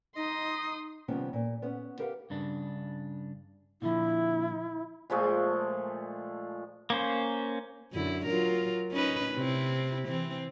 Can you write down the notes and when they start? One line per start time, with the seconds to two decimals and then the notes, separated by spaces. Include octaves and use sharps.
0.16 D#4 D#5 C6 D#6
1.08 C3 D#3 F3 G3 B3 C#4
1.33 A#2
1.62 B3 C#4
1.99 G4 A#4 B4 F5 F#5
2.30 G2 C#3 D4
3.82 A#2 D3 F3 E4
5.10 A#2 F3 G#3 A3
6.90 A#3 C#4 C5
7.93 F#2 D3 E4
8.26 F#3 F4 A#4
8.92 C#4 D#4 B4
9.34 C3 C4 E4
10.07 E3 C4